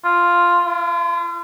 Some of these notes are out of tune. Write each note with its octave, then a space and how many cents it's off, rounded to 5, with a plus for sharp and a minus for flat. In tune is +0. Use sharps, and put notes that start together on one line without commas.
F4 +0
F4 -40